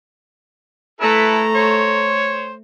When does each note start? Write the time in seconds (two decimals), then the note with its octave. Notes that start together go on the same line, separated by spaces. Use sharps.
1.01 A3 E4 A4 B4 A#5
1.55 C5 C#5